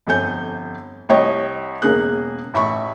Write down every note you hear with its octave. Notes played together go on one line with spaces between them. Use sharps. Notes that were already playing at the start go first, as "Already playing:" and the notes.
G1 F2 A4 G#5 G6
C2 G4 C#5 D#5
E1 C#3 A#3 G#4 F#6
A1 E5 B5 C#6